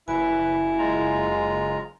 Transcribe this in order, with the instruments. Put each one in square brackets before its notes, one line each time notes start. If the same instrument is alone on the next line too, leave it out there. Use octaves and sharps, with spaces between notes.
[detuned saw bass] F#1 [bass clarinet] E4 [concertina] B4 [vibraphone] G#5
[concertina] G#3 F4 A#5